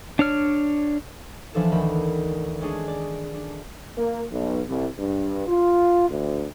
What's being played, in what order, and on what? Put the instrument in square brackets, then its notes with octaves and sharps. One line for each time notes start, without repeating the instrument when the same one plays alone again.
[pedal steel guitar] D4 C#5 F6
[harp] E3 F3 D4 E4 A4
D2 D#3 B5
G#3 C#4 D4 G#4
D5
D4
[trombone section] A#3
B1
C2
G2
F4
D2